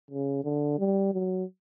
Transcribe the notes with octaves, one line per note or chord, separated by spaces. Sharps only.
C#3
D3
G3
F#3